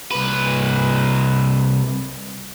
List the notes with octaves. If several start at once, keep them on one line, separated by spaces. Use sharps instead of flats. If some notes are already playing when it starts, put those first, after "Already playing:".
C2 B4